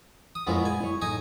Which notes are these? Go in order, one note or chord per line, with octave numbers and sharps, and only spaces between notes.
D#6
F2 A#2 G#3 B3 E4 C#5
G#3 G#5
E4 C#5
A2 A3 D#4 G#5 D#6